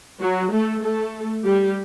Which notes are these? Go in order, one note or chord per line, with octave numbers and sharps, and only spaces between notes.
F#3 F#4
A3 A4
A3 A4
G3 G4